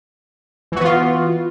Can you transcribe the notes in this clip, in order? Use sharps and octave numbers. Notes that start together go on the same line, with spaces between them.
E3 B3 F4 F#4